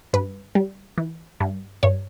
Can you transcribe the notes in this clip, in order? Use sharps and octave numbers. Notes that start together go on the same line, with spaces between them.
G2 B4
G3
E3
G2
G2 C#5